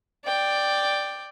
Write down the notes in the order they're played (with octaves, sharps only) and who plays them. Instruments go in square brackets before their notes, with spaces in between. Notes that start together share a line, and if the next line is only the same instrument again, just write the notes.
[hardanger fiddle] D5 G5